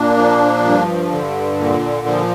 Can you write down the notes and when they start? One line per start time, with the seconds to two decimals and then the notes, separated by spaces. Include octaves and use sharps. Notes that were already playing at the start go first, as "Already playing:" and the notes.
Already playing: A#2 A#3 D4
0.17 F3
0.64 G2
1.12 D3
1.59 A#2
2.07 F3